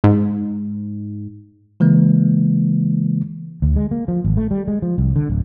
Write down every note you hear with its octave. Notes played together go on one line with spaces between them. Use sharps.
G#2
C#3 E3 G#3 A#3
D2
G#3
A#3
F3
G#1
A3
G3
G#3
F3
C2
D3
D1